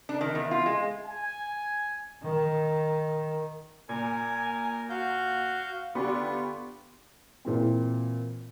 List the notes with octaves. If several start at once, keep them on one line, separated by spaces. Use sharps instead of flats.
D4
D#3
E2
F4
G#3
G#5
D#3
A#2 A#4 G#5
F#4 F5 G6
D3 B3 F4 G4 D5 C#6
A#2 E3 C4